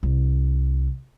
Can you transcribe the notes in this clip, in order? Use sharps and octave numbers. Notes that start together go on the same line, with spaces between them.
C2